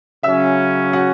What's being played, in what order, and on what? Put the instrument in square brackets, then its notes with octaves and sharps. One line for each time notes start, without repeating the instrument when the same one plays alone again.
[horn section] C#3 F#3 C#4 [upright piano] E5 E6
[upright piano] F#4 F#5